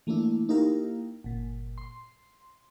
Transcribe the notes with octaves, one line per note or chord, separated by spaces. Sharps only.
E3 A3 A#3 D4 E4
A#3 D#4 E4 G4 A#4 F5
G1 A#2
C6